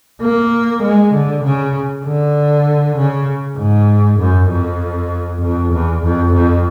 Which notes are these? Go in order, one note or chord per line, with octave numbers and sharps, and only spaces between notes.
A#3
G#3
D3
C#3
D3
C#3
G#2
F#2
F2
F2
E2
F2
F2